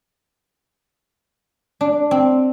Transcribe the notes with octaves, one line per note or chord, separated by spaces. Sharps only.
D4
C4